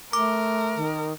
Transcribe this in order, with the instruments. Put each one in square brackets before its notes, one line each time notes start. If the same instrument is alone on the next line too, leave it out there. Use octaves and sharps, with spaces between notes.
[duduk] A3 [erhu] A#4 [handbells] D6
[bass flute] D#3